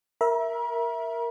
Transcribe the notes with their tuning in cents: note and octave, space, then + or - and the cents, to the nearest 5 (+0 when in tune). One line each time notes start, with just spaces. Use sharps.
A#4 +0 E5 +0 A#5 +45